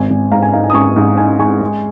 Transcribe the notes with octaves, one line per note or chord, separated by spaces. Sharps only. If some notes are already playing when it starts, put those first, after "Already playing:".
Already playing: G#1 G#5
G#1
G#2 F5 A#5
G#5
D#4 F5
G#5
D#6
G#2 G#5 C#6
G#2
D#4 G#5
G#3 G#5 C#6
G#3